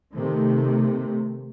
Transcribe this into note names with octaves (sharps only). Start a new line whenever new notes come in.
C3 D#3 A3